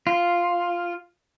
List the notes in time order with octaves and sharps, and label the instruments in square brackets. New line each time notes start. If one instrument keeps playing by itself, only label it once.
[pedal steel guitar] F4